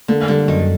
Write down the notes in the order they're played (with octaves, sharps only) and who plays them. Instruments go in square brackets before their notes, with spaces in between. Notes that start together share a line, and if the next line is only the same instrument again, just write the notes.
[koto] D3 [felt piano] A#3
[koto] D3 [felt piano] G3
[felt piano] F#2 [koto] D#3